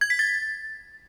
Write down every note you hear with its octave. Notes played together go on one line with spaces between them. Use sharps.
G#6
B6
A6